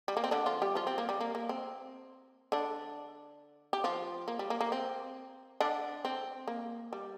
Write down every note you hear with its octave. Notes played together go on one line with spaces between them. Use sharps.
G3
A#3
C4
D3 D4
F3 F4
G3 G4
F3 F4
C4
A#3
G3
A#3
A#3
C4
D3 D4
G4
F3 F4
A#3
G3
A#3
A#3
C4
D3 D4
C4
A#3
G3